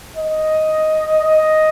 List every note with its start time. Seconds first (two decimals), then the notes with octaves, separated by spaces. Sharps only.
0.17 D#5
1.24 D#5